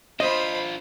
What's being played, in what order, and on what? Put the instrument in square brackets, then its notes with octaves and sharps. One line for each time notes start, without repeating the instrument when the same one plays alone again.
[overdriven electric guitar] D4 F4 [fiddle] C5 B5 [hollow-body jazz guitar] D#5